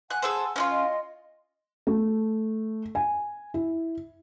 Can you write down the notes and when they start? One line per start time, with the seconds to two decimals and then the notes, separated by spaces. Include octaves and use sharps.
0.11 F#5 G#5 F#6
0.22 G#4 A4 C5
0.56 C#4 D#4 F4
0.70 D#5 C6
1.87 A3
2.95 G#5
3.54 E4